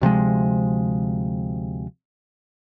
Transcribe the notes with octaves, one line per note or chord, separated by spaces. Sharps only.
D2 C3 F3 G#3